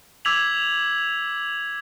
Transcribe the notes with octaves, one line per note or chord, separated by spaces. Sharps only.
D6 E6 G#6 B6 F7 F#7